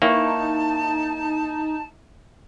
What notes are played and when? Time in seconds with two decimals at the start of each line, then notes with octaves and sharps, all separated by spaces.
0.02 A#3 D#4 E4 C#5 G5 A5